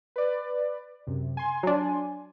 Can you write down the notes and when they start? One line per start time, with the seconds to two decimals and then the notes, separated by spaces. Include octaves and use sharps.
0.16 B4 D5
1.07 F#2 C3
1.37 G#5 C6
1.63 F#3 D4